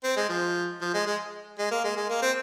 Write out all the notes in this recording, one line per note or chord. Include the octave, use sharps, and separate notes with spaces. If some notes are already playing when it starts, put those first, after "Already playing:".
C4
G#3
F3
F3
G#3
G#3
G#3
A#3
G#3
G#3
A#3
C4